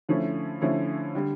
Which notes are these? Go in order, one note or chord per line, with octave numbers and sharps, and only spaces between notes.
D3 F3 A3 C#4 E4
D3 F3 A3 C#4 E4
D3 G3